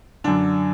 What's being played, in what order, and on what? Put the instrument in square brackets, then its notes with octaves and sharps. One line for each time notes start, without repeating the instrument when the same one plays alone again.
[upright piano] F#2 D3 D4